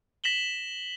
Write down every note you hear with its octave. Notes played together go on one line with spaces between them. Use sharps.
A#6 B6 E7 F#7 G7